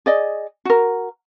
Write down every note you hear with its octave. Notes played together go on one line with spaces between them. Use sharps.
G#4 D5 D#5
F#4 A#4